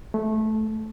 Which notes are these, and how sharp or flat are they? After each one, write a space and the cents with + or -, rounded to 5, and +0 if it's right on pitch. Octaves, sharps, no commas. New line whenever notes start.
A3 -15